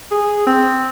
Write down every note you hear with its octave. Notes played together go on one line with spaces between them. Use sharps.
G#4
C4